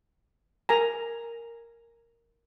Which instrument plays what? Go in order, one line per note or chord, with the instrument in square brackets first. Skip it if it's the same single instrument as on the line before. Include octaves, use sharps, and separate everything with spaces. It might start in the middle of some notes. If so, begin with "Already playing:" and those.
[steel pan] A#4 G#5 A#5